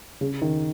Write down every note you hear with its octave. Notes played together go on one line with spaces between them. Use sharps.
C#3
D#3